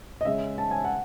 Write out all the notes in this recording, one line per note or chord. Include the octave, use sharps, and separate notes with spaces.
D#5
C#3 G#3 C#4 E5
A5
G#5
F#5